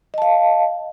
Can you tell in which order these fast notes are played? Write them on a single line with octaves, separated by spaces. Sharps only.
D#5 A5 F5